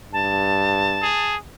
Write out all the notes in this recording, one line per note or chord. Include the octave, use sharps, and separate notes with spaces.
G2 A5
G#4